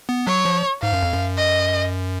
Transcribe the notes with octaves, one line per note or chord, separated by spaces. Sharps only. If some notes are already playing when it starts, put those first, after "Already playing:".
B3
F#3 C#5
F3
G#2 F5
F#2
F2
F#2
D#5